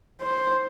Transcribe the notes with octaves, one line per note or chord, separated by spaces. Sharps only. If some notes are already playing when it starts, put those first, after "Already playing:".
C5